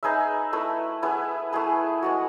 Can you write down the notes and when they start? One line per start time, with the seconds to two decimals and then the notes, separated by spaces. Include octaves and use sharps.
0.03 D#4 G#4 B4 E5
0.53 A3 E4 B4
1.02 B3 E4 G#4 B4
1.53 A3 E4 G#4 B4
2.02 G#3 B3 F#4